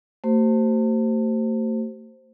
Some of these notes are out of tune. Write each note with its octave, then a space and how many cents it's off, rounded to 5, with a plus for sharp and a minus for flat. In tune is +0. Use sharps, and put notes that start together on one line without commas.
A3 +40 G4 -45 C5 +0